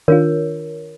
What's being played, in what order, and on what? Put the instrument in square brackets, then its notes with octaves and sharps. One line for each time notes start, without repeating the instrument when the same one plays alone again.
[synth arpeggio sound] D#3 D4 F4 [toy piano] A#4 C#5